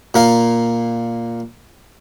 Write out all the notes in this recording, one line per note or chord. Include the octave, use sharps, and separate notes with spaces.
A#2 A#4 F5